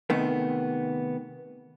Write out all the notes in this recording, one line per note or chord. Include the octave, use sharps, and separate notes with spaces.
C3 D#3 A3 B3